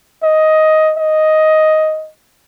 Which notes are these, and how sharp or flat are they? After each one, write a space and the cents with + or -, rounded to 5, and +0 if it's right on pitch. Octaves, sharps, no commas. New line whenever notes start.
D#5 +10
D#5 +5